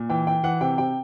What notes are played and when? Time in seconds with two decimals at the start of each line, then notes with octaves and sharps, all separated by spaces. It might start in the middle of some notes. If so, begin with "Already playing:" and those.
Already playing: A#2
0.09 E3 G5
0.27 E3 G5
0.43 E3 F#5
0.61 C3 G5
0.78 C3 G5